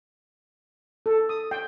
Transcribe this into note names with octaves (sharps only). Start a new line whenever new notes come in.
A4
D#6
G5